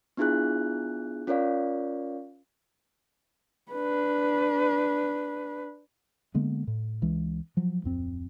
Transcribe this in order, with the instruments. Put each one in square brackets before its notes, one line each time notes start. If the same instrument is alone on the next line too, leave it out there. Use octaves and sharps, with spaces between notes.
[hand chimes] B3 D4 E4 F4 G#4 F#6
C#4 F4 A#4 C#5 D5 F5
[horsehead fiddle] D4 B4
[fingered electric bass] D3 G#3 A#3 B3
A2
C#2 E3 G#3
F3 F#3
D1 F2 C4